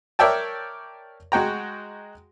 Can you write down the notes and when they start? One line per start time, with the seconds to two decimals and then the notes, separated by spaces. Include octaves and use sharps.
0.19 A#4 C#5 D5 E5 G5 A5
1.32 G#3 F#4 G5 A#5